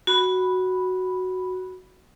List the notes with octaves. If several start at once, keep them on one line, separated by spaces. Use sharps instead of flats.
F#4 B5